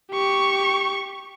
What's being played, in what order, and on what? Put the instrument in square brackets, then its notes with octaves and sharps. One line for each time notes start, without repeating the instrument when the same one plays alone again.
[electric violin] G4 C#6